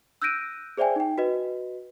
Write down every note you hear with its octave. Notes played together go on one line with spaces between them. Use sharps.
E6 F#6 G6 A#6 D7 D#7
G#4 C5 D5 E5 G5 G#5
D#4 G5
F#4 B4 D#5